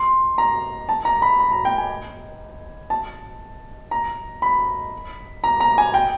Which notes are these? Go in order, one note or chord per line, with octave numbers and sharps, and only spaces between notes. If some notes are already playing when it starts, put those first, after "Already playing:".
Already playing: C6
A#5
A5
A#5
B5
B5
A#5
G5
G#5
A5
A#5
B5
A#5
A#5
G#5
G5